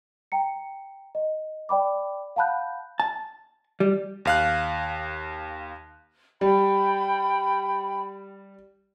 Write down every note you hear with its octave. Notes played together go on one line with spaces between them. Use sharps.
G5 A#5 C#7
D#5
D5 G5 B5 D6
F5 F#5 A5 B5 F#6 G6
A5
G3
D#2 F5 F#6
G3 G5 B5